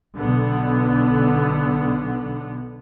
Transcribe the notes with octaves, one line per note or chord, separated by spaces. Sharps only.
B1 D3 B3